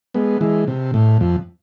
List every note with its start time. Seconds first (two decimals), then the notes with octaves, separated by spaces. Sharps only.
0.14 G#3 B3
0.41 E3 G#3
0.68 C3
0.94 A2
1.21 F2